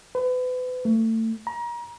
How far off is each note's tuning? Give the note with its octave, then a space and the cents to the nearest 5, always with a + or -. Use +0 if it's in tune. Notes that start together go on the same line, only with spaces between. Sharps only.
B4 +35
A3 +30
A#5 +30